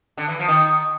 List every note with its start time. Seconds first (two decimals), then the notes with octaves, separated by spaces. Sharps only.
0.17 D3
0.28 E3
0.39 F3
0.48 D#3